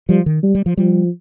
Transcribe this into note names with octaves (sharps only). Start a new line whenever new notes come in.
F3 G3
D#3
G3
G3
F3
F3 G3